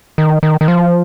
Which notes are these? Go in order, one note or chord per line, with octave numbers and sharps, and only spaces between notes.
D#3
D#3
D#3
F3